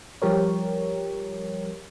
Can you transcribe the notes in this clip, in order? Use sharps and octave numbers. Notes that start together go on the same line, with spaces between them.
F3 G3 G4 A#4 C#5